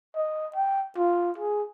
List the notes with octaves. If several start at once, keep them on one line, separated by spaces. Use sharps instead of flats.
D#5
G5
F4
G#4